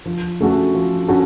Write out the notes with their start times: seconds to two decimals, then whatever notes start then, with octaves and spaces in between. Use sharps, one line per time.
0.06 F3
0.40 A3 C#4 F#4 A4
0.75 F3
1.08 C#4 F#4 A4